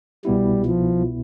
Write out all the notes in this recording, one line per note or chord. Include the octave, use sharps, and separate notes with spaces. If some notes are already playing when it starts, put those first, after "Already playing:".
C2 B2 G3 B3 E4
F3